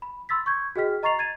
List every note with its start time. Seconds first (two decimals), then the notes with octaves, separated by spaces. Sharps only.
0.02 B5
0.29 B5 C6 E6 A6 B6
0.46 C#6 G6 G#6
0.76 F#4 G#4 D#5 G5 F6 B6
1.03 D#5 A#5 C#6 A6 C7 F7
1.19 G#6 A6 D#7